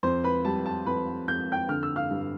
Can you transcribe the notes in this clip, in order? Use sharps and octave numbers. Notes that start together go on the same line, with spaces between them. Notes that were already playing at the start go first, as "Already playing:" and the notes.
F2 C5 C6
B4 B5
G3 A5
A5
F2 B4 B5
F2 G6
G5 G6
D3 F6
E6
F5 F6
G2